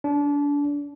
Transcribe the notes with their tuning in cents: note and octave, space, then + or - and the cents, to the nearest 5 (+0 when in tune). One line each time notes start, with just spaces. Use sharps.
D4 -30